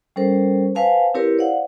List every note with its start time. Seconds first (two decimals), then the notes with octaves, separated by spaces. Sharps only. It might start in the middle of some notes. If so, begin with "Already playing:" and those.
0.16 G3 C#4 A4 A#4 C5
0.75 B4 C5 F5 G#5 A5
1.14 C4 E4 G4 A#4 B4 C#5
1.38 C5 D5 F5 F#5